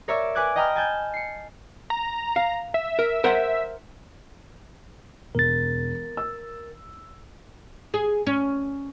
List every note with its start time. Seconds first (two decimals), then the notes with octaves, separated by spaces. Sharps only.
0.08 A#4 C#5 D5 E5
0.35 B4 G#5 D6 F#6 G#6
0.56 D#5 G5 A#5 B5 D#6 F6
0.75 G#5 A5 G6 G#6
1.14 C7 C#7
1.90 A#5
2.36 F5
2.74 E5
2.99 A#4
3.24 A#4 C5 F#5
5.35 E1 A#4 A6
6.17 E6
7.94 G#4
8.27 C#4